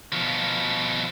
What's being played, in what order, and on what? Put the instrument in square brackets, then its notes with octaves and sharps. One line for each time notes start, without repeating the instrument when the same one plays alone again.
[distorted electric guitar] B2 F3